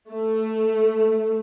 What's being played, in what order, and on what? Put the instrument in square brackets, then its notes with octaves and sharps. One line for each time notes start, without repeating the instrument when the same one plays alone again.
[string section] A3